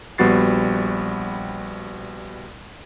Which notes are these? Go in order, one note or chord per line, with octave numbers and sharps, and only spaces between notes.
A#1 G3 B3 F#4 A6 C7